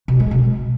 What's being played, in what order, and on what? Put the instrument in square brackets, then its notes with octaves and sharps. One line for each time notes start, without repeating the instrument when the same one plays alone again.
[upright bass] B2
G#3
B2